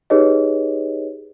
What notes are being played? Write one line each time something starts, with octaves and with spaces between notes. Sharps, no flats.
D#4 G4 G#4 B4 C#5 D#5